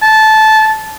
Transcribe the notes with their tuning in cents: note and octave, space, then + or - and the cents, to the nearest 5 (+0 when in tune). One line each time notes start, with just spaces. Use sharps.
A5 -15